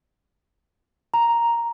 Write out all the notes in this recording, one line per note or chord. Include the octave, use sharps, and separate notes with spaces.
A#5